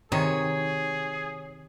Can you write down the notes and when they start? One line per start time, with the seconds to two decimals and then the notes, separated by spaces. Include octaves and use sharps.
0.12 C3 D#3 G#4 C#5